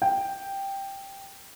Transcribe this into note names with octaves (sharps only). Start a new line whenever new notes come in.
G5